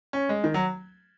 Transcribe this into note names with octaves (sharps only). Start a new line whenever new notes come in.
C#4
G#3
D#3
F#3